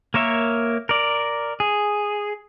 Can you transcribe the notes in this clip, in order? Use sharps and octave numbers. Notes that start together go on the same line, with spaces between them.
A#3 A#4 C#5 E5
A#4 D5
G#4